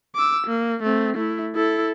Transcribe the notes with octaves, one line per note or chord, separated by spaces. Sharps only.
D6 E6
A#3
A3 C4
A3 E4
E4 A4